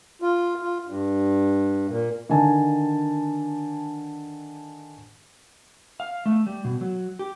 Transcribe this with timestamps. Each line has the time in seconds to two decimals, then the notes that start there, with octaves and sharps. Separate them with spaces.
0.22 F4
0.61 F4
0.87 G2
1.89 A#2
2.29 D3 D#3 G#5 A5
6.00 F5
6.26 A3
6.46 G3
6.65 B2
6.81 F#3
7.19 G4